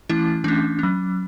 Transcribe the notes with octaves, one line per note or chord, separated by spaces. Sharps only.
E3 A3 C#4 E4
E3 A3 C#4 D4
F#3 C#4